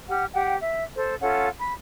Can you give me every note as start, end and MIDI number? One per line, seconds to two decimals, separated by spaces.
0.09 0.25 67
0.09 0.25 78
0.09 0.25 89
0.33 0.56 67
0.33 0.56 78
0.33 0.56 79
0.61 0.84 76
0.96 1.15 69
0.96 1.15 72
1.20 1.48 61
1.20 1.48 65
1.20 1.48 69
1.20 1.48 78
1.60 1.73 83